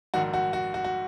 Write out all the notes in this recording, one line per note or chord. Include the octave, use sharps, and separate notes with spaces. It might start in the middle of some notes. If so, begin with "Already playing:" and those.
A#1 G#2 D#3 F#4
F#4
F#4
F#4
F#4